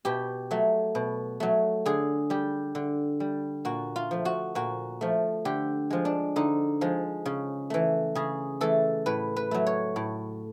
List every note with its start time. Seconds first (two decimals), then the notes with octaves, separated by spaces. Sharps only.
0.05 B2 G4
0.51 F#3 A3
0.95 B2
1.40 F#3 A3
1.86 D3 G#4
2.30 G3 G4
2.75 D3
3.20 G3
3.65 A#2 F#4
3.96 F4
4.11 F3 A3
4.25 F#4
4.55 A#2 F#4
5.01 F3 A3
5.45 D3 G4
5.90 F3 G#3
6.05 D4
6.36 D3 D#4
6.81 F3 G#3
7.26 C#3
7.70 E3 A3
8.15 C#3 G#4
8.61 E3 A3 A4
9.06 A2 B4
9.36 B4
9.51 F#3 A3
9.67 C#5
9.96 A2